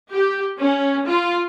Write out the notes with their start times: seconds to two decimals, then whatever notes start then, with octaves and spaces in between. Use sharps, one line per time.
0.11 G4
0.59 C#4
1.07 F4